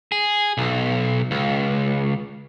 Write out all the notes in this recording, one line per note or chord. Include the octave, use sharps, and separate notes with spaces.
G#4
B1
C#2